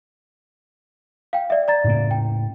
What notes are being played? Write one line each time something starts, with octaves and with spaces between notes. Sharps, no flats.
F5 G5
D5 E5
D5 A#5 A6
A2 C#3 A#3
G5